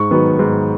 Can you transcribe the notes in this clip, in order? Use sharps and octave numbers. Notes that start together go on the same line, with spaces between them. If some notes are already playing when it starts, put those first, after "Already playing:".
Already playing: G#2 C#6
D#3 F#3 B3
G#2